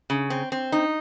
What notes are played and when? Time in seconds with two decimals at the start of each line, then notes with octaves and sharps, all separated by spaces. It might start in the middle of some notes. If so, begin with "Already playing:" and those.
0.10 C#3
0.30 C4
0.52 C4
0.72 D#4